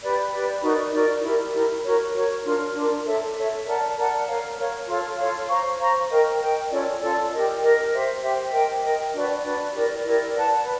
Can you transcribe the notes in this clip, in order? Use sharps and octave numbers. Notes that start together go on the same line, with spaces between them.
G4 B4 D5
G4 B4 D5
D#4 F#4 A#4 D5
D#4 F#4 A#4 D5
E4 G4 A#4
E4 G4 A#4
F#4 A#4 C#5
F#4 A#4 C#5
D4 F4 A#4
D4 F4 A#4
A4 C#5 E5
A4 C#5 E5
A#4 D5 F#5 A5
A#4 D5 F#5 A5
A#4 C#5 F5
A#4 C#5 F5
F4 A4 C#5 F5
F4 A4 C#5 F5
C5 F5 A#5 C#6
C5 F5 A#5 C#6
A#4 D#5 G5
A#4 D#5 G5
C#4 F4 A4 D5
C#4 F4 A4 D5
G4 A#4 D#5
G4 A#4 D#5
G4 C5 E5
G4 C5 E5
A#4 D#5 G5
A#4 D#5 G5
D4 F#4 B4 D5
D4 F#4 B4 D5
E4 G4 A#4 D5
E4 G4 A#4 D5
B4 D5 F#5 A5
B4